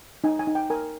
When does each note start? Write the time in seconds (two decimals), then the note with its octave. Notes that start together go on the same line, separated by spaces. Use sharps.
0.24 D#4 G#5
0.39 G#5
0.47 D#4
0.55 G5
0.70 A#4 G#5